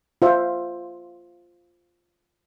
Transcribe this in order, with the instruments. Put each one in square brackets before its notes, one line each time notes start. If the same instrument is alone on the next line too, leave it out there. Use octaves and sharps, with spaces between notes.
[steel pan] F4 C5 E5